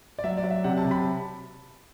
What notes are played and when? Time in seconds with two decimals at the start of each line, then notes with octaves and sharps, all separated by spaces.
0.19 D5
0.24 F#3 E5
0.37 D5
0.44 F#3
0.50 E5
0.64 C3 F#5
0.78 A5
0.85 C3
0.91 B5